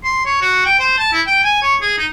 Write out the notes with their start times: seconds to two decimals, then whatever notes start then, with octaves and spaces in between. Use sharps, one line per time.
0.04 C6
0.26 C#5
0.41 F#4
0.66 G5
0.80 C5
0.99 A5
1.13 E4
1.27 G5
1.44 G#5
1.62 C#5
1.82 G#4
1.98 D#4